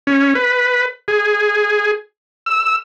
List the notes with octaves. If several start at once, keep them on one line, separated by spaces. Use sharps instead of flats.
C#4
B4
G#4
E6